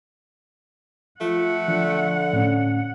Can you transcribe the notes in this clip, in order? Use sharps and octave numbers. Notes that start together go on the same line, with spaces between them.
F3 A3 F#5
D3 F3
A2 C#4